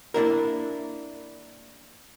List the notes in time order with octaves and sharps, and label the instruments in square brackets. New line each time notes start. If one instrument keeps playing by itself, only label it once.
[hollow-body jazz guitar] A#3 D4 E4 A#4